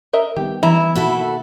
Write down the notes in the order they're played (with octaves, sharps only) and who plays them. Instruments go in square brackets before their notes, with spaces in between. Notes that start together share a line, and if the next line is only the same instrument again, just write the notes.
[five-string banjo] A#4 D#5 E5
[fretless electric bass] D#3 G3 B3 [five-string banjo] G4
[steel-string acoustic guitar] E3 [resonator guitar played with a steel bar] E4 [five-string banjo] A#5
[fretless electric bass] B2 D#3 A#3 [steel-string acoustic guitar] F#4 A4 E5